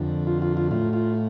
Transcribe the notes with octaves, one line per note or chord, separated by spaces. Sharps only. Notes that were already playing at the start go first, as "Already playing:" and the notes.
Already playing: F2 D3
F4
F4
F4
A2 F4
F4